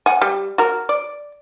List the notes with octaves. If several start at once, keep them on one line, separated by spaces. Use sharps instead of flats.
F#5 G#5
G3
F#4 A#4
D5